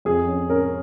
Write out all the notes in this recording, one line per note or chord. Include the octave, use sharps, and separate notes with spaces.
F2 G#4
C#4
C#4 A#4